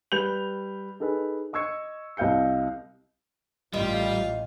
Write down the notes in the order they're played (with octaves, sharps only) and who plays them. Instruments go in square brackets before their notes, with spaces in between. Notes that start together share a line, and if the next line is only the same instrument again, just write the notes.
[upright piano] G3 B4 G6 F7
D#4 G#4 A4 B4
D#5 C#6 E6 G#6 C#7
C2 D#5 F5 G6 C#7
[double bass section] A1 [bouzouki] D#3 [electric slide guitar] G3 [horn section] F4